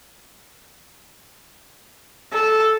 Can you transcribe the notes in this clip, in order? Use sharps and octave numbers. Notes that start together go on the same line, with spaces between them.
A4